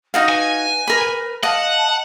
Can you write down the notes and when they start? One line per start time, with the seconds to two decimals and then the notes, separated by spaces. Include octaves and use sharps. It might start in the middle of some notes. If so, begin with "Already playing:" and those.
0.14 D#4 F#4 F5 D#6
0.29 B4 G#5
0.88 A#4 B5
1.43 D#5 F5 F#5 A5